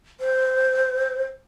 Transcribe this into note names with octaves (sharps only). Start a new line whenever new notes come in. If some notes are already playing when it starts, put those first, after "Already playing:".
C5